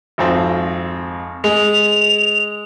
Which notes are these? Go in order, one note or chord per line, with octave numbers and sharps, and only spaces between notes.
G#1 F2 C4
G#3 F7